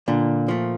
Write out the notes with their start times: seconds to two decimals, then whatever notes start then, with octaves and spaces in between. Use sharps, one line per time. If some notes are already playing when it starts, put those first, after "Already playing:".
0.08 A#2 D3
0.48 F3 A3